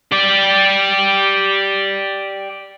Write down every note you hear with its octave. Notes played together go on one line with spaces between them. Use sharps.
G4 D5